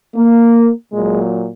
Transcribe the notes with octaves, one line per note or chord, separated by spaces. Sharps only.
A#3
A#2 F#3 G#3